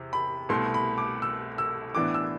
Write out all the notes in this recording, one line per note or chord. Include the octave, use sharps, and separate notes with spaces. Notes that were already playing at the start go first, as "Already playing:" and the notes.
Already playing: E2 C3
B5
C2 B2 A3 C6
B5
D6
E6
E6
A2 E3 B3 D4 D6
E6